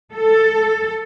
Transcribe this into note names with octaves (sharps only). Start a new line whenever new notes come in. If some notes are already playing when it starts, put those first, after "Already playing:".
A4